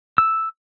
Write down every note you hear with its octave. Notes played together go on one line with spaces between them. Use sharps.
E6